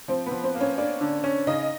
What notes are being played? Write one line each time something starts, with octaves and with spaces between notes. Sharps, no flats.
F3 C4 C5
B3 B4
F3
C4 C5
A#3
C#4 C#5
A#3 D4 D5
D3
C#4
C#3 D#4 D#5